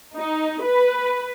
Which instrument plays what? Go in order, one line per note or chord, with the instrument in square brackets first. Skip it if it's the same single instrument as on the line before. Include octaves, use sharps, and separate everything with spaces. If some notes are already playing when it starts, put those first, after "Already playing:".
[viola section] D#4
B4